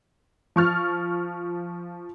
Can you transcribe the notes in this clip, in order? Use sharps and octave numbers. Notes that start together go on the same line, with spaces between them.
F3 C#6 F6 A6